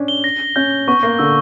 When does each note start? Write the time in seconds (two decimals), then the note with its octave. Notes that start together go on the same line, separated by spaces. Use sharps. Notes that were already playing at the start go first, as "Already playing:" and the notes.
Already playing: C#4 D4
0.08 G7
0.24 A#6
0.40 A#6
0.56 C#4 G6
0.71 G6
0.88 B3 C#6
1.03 A#3 A#6
1.19 D3 E6